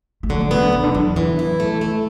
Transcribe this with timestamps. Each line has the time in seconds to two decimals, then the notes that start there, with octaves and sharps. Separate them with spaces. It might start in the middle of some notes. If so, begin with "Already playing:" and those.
0.23 A3
0.29 D3 F#3
0.41 A3
0.51 F#3 B3
0.62 D3
0.73 E2 B2
0.83 D3
0.95 E2 F#3
1.16 E3 F#3
1.39 E4
1.60 A3
1.81 A3